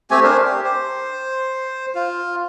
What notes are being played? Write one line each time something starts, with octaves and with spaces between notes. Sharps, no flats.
A3 C4 G4 G#5
D4 A#4 C5
G4
C5
F4